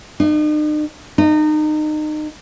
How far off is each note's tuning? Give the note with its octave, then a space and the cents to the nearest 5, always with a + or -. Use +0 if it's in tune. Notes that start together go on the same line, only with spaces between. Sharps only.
D#4 -45
D#4 -30